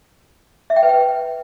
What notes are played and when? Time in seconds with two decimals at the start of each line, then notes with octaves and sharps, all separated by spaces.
0.70 E5
0.76 G5
0.83 B4
0.89 G5